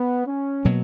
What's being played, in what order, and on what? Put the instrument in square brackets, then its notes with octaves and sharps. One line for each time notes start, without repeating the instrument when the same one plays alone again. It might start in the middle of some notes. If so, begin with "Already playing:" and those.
Already playing: [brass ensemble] B3
C#4
[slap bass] B2 F#3 A#3